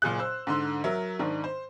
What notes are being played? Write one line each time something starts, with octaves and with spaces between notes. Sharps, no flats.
F#1 A#2 G#4 F#6
C5 E6
G#2 D3 C6
F#3 A#4 E5
G#2 D#3 D4
C5